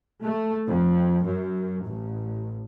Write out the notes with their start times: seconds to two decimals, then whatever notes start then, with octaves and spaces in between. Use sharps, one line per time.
0.23 A3
0.68 F2
1.25 F#2
1.86 A1